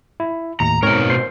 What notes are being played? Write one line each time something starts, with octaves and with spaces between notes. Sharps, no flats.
E4
D#2 A2 A#5
G#2 B2 C4 A#4 C#5
C5 C6 C7